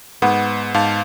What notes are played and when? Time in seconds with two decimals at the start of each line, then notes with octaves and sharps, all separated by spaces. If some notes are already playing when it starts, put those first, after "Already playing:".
0.22 G#2 B3
0.74 G#2 F5 A5